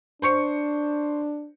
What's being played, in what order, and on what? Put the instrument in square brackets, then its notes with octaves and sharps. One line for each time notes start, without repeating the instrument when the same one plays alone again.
[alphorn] D4 [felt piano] C5 C#6 C#7